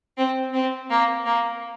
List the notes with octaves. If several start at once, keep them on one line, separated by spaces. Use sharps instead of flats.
C4
C4
A#3
A#3